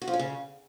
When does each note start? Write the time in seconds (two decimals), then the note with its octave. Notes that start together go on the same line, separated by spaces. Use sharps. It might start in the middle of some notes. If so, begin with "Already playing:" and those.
0.02 F#4
0.07 F3
0.13 C#4
0.19 C#3